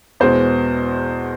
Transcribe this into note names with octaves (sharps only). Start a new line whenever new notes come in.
E2 B2 G#3 C5